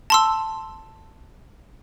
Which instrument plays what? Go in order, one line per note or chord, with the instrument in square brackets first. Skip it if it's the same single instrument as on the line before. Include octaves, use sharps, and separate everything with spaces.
[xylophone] A5 C6 E6